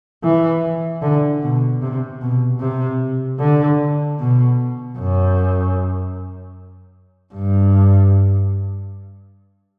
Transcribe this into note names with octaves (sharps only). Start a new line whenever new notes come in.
E3
D3
B2
C3
B2
C3
D3
B2
F#2
G2